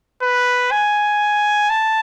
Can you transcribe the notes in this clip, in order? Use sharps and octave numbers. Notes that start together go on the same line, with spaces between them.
B4
G#5
A5